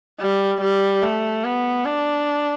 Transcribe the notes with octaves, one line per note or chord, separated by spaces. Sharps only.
G3
G3
A3
B3
D4